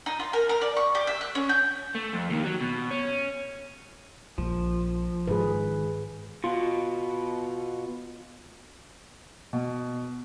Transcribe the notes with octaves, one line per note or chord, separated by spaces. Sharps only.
D#4
F4
A#4
A#4
D5
C#6
G4
E5
F#6
C#4
G6
A3
F2
D#2 D#3
F#3
B2
C#4
A#1 F3
G#2 D#3 G#4 B4
B2 F4
B2